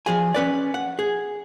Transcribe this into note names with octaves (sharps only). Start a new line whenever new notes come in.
F3 F#3 G#4 G#5
C#4 B4 D5
F#5
G#4